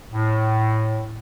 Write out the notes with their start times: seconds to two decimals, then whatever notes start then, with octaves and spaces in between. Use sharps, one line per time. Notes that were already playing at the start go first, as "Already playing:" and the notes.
0.12 A2